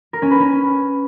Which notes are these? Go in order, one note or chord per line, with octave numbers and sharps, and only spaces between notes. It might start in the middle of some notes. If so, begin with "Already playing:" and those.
A#4
C#4
B4
C#4